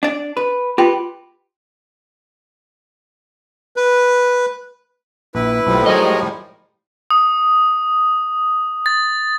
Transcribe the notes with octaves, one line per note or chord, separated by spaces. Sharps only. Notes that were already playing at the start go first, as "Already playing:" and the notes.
D4 D5
B4
F4 G4 B4 G5 C6
B4
A#1 E4 B4
B1 A2 F3 G3
F#3 G#3 D#4 G#4 A#4 C#5 D#5 G#5
D#6
A6